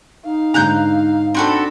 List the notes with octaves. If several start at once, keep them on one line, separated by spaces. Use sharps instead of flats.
D#4 F5
G#2 D3 A#5 F#6 G6
C4 D4 F#4 A4 B5